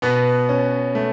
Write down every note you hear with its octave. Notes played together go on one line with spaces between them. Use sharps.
B2 B3 B4
C#4
A3